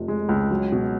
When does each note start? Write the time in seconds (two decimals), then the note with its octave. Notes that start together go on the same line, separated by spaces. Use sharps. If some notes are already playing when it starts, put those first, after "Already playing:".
Already playing: F1 C3 F3
0.08 G#3
0.29 C#2
0.51 F#3
0.72 B2